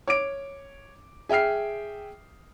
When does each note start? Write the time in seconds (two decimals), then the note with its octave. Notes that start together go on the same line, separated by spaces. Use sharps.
0.08 C#5 D6 D7
1.29 G#4 E5 G5 F6 C7